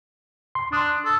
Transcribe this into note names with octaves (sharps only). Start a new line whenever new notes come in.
C6
D4 C6 D#6
A4